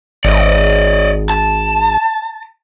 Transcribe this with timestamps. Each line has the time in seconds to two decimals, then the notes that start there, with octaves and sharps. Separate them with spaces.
0.25 G#1 D5 D#5
1.30 A5